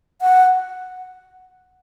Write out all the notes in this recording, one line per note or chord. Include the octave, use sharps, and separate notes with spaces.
F#5